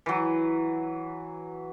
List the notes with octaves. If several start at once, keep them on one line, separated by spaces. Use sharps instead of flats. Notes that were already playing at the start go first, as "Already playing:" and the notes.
E3 F#3